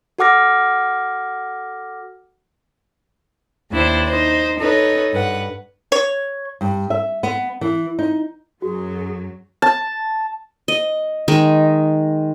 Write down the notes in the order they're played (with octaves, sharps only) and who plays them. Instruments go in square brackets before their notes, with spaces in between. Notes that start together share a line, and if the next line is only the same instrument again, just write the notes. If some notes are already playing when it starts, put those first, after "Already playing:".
[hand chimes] F#4 A4 F#5 D6 F6 A#6
[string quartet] D#2 D4 E4 C5
D#4 C5
D#4 A4 B4 C#5
G2 B4 F#5
[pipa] C#5
[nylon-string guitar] G2
E5
B3
E3
D#4
[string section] F#2 F#3 [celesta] F#4 [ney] G#4
[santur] A5
[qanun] D#5
D#3 G#3 D#4